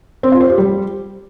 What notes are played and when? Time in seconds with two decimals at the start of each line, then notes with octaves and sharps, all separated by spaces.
0.23 C4
0.32 F4
0.41 C5
0.49 G4
0.58 G3